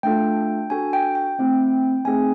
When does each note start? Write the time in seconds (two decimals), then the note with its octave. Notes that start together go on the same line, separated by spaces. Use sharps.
0.03 A3 D4 F4 A4 G5
0.70 D4 F#4 A4 G#5
0.93 G5
1.15 G5
1.38 A3 C4 E4
2.05 A3 C4 D#4 G#4 G#5